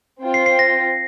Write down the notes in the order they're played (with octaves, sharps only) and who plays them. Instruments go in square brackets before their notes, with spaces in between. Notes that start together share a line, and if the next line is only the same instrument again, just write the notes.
[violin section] C4 F4 C5 G5
[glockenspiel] C7
C7
A#6